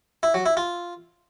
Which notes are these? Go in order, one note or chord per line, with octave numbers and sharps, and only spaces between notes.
E4
F#3
E4
F4